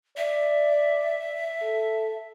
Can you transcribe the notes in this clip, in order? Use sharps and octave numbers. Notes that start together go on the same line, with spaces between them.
D5 E5
A4